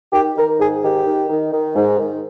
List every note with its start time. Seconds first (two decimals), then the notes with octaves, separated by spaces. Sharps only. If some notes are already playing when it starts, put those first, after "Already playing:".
0.13 D#3 G4
0.36 D#3 A#4
0.59 G#2 G#4
0.82 D#3 G4
1.06 D#3
1.29 D#3
1.53 D#3
1.75 G#2
1.99 D#3